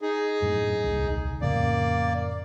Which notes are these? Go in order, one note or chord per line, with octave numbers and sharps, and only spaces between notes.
D#4 G#4
F#2 A2
D#1 C2
F2 A2 C#3 A#3 D5